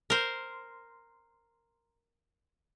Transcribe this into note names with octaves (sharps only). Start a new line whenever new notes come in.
A#4 C5